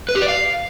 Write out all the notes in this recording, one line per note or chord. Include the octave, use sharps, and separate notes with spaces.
B4
G4
D5
F5